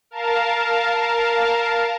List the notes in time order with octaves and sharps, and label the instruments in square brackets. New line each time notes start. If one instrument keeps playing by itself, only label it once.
[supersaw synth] A#4 F5 A5